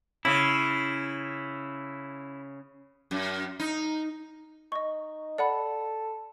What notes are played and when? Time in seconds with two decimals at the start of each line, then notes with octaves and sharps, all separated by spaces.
0.25 C#3 E4
3.11 F#2
3.59 D#4
4.72 D#4 D#5 C#6
5.38 A4 D5 F#5 B5